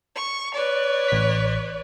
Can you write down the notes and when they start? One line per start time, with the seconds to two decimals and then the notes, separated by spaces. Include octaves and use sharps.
0.16 C#6
0.55 B4 C#5 D5
1.08 A1 B6